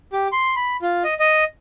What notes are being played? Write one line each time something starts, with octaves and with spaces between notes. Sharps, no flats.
G4
C6
B5
F4
D#5
D#5